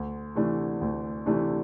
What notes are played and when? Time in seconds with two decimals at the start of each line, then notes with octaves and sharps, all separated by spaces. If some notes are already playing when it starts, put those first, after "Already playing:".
Already playing: D2
0.35 C3 E3 A3 D4
0.81 D2
1.26 C3 E3 A3 D4